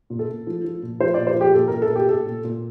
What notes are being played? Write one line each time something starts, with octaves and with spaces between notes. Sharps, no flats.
A#2
A4
A#2
F3
F3
A#2
F3 C5
A#2 D5
C5
F3 G4
A#2 A4
A#2 A#4
A4
A#2
G4
A#2 A4
A#2
A#2